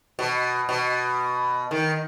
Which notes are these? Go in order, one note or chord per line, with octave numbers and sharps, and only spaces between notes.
B2
B2
D#3